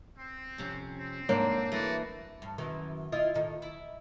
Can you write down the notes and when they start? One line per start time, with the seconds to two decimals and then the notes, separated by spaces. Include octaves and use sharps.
0.18 C4
0.58 F2 C3 C#4
0.97 C4
1.29 F2 G#2 A#3 D4 C#5
1.72 E3 A3 F#4 D5 D#5
2.42 G2
2.58 F#2 D#3 E3
3.12 E4 F4 D#5
3.34 A2 D#3
3.62 E4